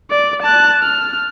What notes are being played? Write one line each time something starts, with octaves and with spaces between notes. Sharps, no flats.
D5
A5 F#6
F6